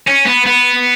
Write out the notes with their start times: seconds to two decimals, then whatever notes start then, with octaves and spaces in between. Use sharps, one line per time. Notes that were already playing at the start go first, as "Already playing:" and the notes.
0.07 C#4
0.26 B3
0.46 B3